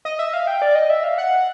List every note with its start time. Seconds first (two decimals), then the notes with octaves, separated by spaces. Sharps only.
0.05 D#5
0.19 E5
0.33 F5
0.47 G5
0.62 D5
0.75 D#5
0.90 E5
1.04 F5
1.18 F#5